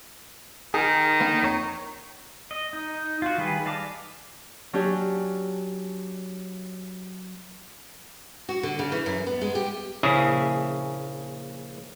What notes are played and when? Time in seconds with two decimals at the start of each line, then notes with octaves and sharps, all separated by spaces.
0.74 D#3 G#4 A#4
1.20 D3 A#3 B3
1.43 F2 C#5 A#5
2.51 D#5
2.73 D#4
3.22 F4 F#4
3.38 D#3 G3 G#4 B4
3.65 D5 D#5 F5 A5 D6
4.73 F#3 C#4 D4 G4
8.49 F#4
8.63 D3
8.79 C#3
8.92 E3
9.06 F#2
9.26 B3
9.41 G#3
9.55 G4
10.03 A#1 C#3 E4 G#4